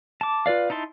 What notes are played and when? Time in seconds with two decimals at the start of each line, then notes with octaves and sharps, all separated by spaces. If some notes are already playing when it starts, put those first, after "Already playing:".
0.21 A5 D6
0.46 F4 B4 D5 F5
0.70 D#4 E4 A5 C6